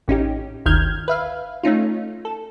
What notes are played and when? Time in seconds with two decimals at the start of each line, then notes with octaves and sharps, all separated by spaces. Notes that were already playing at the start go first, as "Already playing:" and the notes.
0.08 A1 C#4 D#4 G4
0.66 G1 D2 D#3 F6 G6 G#6
1.08 B4 E5 F5
1.63 A3 C#4 D#4 F4
2.25 A4